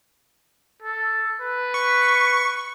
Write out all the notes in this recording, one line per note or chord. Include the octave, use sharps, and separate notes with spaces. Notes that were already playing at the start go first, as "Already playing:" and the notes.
A4
B4
C#6